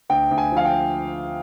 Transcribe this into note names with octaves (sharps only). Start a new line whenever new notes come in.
D2 G5
D2
G#5
F3 F5
G5